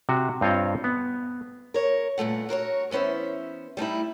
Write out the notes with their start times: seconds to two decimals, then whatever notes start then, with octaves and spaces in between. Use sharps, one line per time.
0.09 C3 F#4
0.41 G2 C4 F4 C#5 D#5
0.84 B3
1.74 A#4 C#5
2.18 G2 A#2 A3 F#5
2.49 F#4 A#4 C5 C#5
2.91 E3 B3 C#4 C5 E5
3.77 G3 A3 D#4 E4